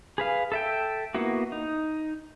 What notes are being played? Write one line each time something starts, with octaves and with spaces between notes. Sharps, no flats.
G#4 B4 F5
A4 E5 G5
A#3 B3 E4 F#4
D#4